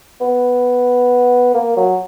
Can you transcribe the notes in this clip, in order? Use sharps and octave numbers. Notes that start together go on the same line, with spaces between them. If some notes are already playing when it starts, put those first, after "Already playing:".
B3
A#3
F#3